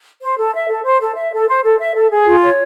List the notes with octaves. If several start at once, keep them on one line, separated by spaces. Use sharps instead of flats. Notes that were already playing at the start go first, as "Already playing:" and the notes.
C5
A4
E5
A4
C5
A4
E5
A4
C5
A4
E5
A4
G#4
F4
C#5